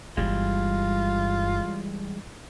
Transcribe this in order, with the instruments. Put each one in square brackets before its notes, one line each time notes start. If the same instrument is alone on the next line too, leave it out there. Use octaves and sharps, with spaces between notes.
[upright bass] G1 G2 [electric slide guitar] E3 G3 G#3 [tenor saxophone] F4